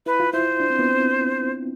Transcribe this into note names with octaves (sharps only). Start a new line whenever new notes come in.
E4 B4
F4
E4 C5
D4
C4
B3
C4